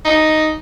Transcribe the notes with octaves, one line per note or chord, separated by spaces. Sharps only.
D#4